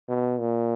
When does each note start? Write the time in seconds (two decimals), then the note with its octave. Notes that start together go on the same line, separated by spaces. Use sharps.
0.09 B2
0.40 A#2